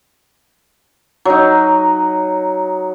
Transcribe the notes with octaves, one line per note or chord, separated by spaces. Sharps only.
F#3 D#4